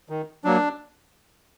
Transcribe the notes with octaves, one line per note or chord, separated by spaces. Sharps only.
D#3
F#3 A#3 D4